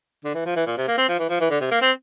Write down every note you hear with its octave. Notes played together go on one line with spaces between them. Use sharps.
D3
E3
F3
E3
A#2
C3
A#3
C4
F3
E3
F3
E3
D3
C3
A#3
C4